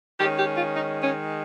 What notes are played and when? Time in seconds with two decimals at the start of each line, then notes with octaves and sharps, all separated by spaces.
0.20 D#3 G#3 C#4 G4
0.39 G4
0.57 F4
0.76 D#4
1.03 C#4